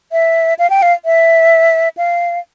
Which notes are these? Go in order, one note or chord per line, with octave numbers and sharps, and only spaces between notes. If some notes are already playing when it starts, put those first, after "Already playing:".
E5
F5
G5
F5
E5
F5